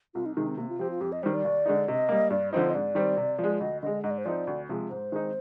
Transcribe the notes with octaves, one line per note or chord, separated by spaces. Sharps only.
C2 F4
D#4
C3 D#3 G#3 D#4
C4
C3 A#3
F4
F3 C4 G4
F4
F2 G4
D#5
D#3 G3 C5
D5
D#2
D3 G#3 D#4
C3 D#5
G3 A#3
G2 D5
D3 F3 C4 D#4 C5
D#5
G#2 D5
D#3 G3 C4
C3
F3
G#3
D2 D#5
D3 G#3 D#5
G#2 D#5
D5
C5
F3 C4 D#4 D5
D2
C3 F3 G#3
G#2 C5
D#3 G#3 C4 D#4